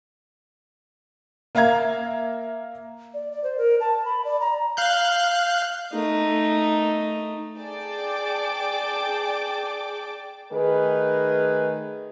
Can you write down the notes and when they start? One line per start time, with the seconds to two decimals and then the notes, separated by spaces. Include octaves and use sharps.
1.55 A#3 E5 F5 A#5 G#6
3.14 D5
3.32 D5
3.44 C5
3.58 A#4
3.80 A5
4.05 B5
4.25 D5
4.41 A#5
4.77 F5 F#6 G6
5.93 A3 D#4
7.58 G#4 D5 G5 A5 D6
10.53 D#3 A3 G#4 B4